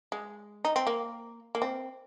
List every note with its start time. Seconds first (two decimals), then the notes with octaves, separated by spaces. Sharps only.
0.12 G#3
0.65 D#4
0.76 C4
0.87 A#3
1.55 A#3
1.62 C4